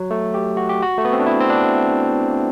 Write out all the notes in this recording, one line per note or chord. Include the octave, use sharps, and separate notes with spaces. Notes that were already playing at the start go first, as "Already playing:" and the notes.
Already playing: F#3
A3
G4
F#4
G4
F#4
A3
B3
C4
D4
E4
C4
D4